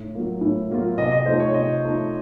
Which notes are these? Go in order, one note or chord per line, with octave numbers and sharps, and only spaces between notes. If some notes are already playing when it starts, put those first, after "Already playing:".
Already playing: A2
F#3 A#3 F4
A2
F#3 A#3 F4
C3 D#5
D#5
F3 A3 D#4 C5
C#5
C3 D#5
F3 A3 D#4